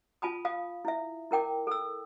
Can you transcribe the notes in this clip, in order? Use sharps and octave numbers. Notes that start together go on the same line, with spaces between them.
F4 G#5 A5 B5 D#6
F5 D#6
E4 E5
E4 A#4 G5 D6
A4 E6